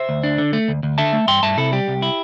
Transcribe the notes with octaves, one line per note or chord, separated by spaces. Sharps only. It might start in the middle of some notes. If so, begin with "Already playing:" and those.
Already playing: C5 E5
D2
D4
D3
A3
D2
D2
D3 E5 A5
A3
G2 G5 C6
G2 E5 A5
C3 E4 A4
G3 G4
C2
E4